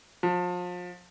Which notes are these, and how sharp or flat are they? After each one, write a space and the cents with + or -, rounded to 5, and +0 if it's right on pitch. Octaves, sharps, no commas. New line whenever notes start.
F3 +35